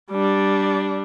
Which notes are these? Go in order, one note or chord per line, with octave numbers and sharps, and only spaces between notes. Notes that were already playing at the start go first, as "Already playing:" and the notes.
G3 D4